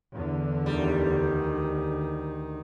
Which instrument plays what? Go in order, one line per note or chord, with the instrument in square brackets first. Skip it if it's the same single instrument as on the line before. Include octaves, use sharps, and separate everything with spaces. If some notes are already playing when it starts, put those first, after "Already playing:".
[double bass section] E2 D3
[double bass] D2 D#3 [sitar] G3